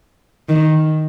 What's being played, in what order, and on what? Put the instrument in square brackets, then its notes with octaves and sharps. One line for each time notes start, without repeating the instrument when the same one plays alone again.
[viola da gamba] D#3